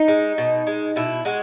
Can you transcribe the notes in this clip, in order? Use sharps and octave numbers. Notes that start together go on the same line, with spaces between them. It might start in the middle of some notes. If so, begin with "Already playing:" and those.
Already playing: D#4
G#3
B2
G#3
B2 E4
G#3 F#4